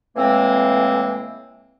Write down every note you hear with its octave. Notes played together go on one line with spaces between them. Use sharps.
A2 E3 G#3 A#3 C4